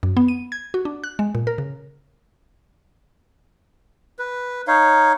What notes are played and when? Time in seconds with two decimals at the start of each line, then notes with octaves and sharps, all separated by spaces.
0.03 F#2
0.17 B3
0.28 D#7
0.52 G#6
0.74 F#4
0.85 D4
1.04 F#6
1.19 G#3
1.35 A#2
1.47 A#4
1.58 C#3
4.19 B4
4.67 D#4 C#5 F5